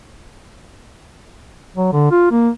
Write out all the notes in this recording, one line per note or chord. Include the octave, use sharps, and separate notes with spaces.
F#3
D3
F4
A#3